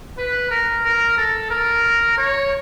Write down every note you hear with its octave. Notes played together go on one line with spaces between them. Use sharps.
B4
A#4
A#4
A4
A#4
C#5